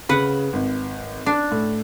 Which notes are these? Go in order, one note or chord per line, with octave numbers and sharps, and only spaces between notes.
C#3 B4 F#5
G#1
D4
A2